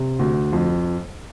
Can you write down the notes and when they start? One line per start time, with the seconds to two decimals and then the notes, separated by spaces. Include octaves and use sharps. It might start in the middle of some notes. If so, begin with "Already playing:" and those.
Already playing: C3
0.19 D2
0.53 F2